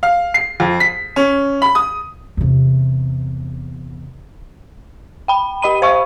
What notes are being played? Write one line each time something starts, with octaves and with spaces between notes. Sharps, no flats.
F5
C7
F2
B6
C#4
B5
D#6
E2 C3
G5 B5
G4 D#5 B5 D#7
C5 F5 C#6